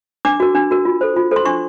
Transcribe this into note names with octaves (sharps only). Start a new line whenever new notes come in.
D4 D6
F#4 A#4
D4
F#4 A#4
F4
A4 C5
F4
A4 C5 C6
D4 C#6